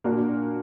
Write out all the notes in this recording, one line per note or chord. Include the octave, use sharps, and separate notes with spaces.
A#2 A#3 D4 F#4